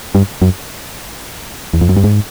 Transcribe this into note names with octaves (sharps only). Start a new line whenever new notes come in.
G2
F#2
E2
F2
F#2
G2
G#2